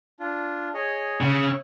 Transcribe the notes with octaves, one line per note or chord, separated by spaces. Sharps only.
D4 F4
G#4 C#5 D#5
C#3 C#6 E6 F#6